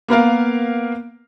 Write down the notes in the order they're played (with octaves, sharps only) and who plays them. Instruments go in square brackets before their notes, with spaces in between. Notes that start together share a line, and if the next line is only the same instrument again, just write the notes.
[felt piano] A#3 B3 A#4 F5